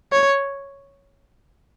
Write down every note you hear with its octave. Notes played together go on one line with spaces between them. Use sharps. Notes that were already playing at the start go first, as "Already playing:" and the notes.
C#5